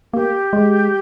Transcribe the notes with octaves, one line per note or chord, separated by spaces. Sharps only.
A#3 G4
G#3